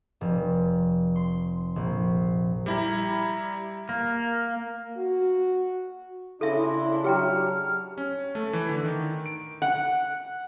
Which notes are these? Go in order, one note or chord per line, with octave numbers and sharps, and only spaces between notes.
F1
C6
A#1
G3 E4 A#5
A#3
F#4
C#3 D4 E4 A4 E5 C6
F#3 G4 G5 A#5 F6
C#4
A3
E3
D3
D#3
D7
F#5